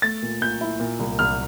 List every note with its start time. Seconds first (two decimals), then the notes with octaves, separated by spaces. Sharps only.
0.02 A3 A6
0.22 A#2
0.41 A#2 G6
0.61 E4
0.80 A#2
0.99 C2
1.19 C2 F6